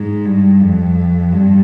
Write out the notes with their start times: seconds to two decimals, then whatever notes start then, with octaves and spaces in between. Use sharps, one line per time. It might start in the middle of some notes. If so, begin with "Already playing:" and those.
Already playing: G#2
0.25 G2
0.61 F2
1.32 G2